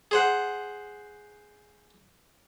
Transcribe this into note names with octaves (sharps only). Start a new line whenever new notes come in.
G#4 C5 F#5